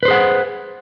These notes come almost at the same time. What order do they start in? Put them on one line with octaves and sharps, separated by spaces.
B4 C5 G#4 F#5